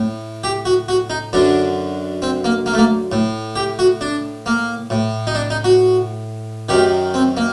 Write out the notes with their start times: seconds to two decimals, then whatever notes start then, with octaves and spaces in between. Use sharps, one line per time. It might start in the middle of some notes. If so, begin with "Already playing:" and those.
Already playing: A2
0.44 G4
0.65 F#4
0.88 F#4
1.10 D#4
1.33 F#2 D3 D4
2.22 C4
2.44 A#3
2.66 A#3
2.74 A3
2.78 A#3
3.12 A2
3.55 G4
3.79 F#4
4.01 D4
4.46 A#3
4.90 A2
5.27 D#4
5.35 D4
5.50 D#4
5.64 F#4
6.69 F#2 D#3 G4
7.14 C4
7.37 A#3